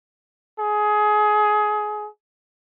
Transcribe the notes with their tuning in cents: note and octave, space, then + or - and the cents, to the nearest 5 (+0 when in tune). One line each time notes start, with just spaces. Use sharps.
G#4 +25